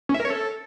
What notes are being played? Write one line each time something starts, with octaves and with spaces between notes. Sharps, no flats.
C#4
E5
A#4
C#5
A4